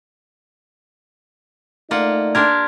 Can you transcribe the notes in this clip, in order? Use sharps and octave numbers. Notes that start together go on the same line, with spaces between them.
A3 A#3 D#4 F4 D5 F#5
D4 G4 A#4 C6 F6 G#6